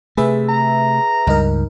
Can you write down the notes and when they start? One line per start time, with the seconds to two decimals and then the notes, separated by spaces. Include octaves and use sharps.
0.17 C3 A3 G#4 B4 E5
0.48 A#5
1.27 C#2 G2 D#4 A#4